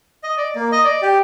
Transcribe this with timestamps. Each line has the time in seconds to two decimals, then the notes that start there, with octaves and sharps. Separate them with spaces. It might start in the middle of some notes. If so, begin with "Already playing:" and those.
0.23 D#5
0.37 D5
0.55 A#3
0.72 D#5
0.84 D5
1.02 G4